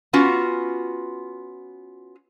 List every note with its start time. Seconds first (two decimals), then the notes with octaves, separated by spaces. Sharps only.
0.13 B3 C#4 F4 F#4